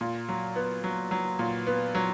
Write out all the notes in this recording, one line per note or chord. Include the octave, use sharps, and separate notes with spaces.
A#2
F#3
B3
F#3
F#3
A#2
B3
F#3